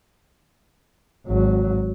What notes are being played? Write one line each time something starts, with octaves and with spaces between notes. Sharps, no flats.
G#1 F#3